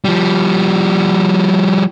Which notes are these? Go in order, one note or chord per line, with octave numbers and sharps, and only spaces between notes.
F3 G3